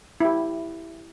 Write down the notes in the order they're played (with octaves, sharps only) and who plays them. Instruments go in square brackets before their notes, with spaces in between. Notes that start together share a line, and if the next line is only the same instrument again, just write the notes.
[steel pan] E4 G4